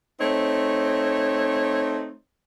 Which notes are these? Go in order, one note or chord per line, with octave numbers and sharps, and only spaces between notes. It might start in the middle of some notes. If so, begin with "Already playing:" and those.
A3 C4 D#4 C#5